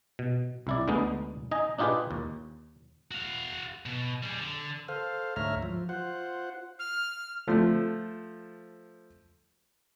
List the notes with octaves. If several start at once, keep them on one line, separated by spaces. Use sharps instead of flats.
B2
C2 E4 D5
D2 D3 G#3 B3 D#4
D#4 D#5 G#5
D4 D#4 F4 G4 G#4 B4
D#2
F#4 F5
B2
G3 G#4
D3
A4 C5 F5
D2 G#2 C#5 E5 A#5 F6
F3
F4 C5 F#5
F6
F3 A3